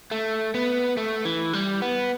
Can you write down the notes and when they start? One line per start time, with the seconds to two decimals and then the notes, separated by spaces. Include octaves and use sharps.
0.11 A3
0.54 B3
0.97 A3
1.25 E3
1.53 G3
1.82 B3